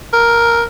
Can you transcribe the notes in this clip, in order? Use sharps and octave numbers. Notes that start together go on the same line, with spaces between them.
A#4